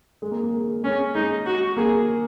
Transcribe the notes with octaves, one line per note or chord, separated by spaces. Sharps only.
G#3
A#3
A#3
G#3
G#3 C#4
G#3 D#4
F#4
A#3 G#4